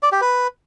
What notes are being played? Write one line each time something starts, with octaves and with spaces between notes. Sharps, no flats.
D5
G4
B4